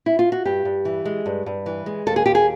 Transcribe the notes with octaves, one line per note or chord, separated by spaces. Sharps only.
E4
F4
F#4
G2 G4
G2
E3
G#3
G2
G2
E3
G#3
D#2 A4
G#4
D#2 G4
G#4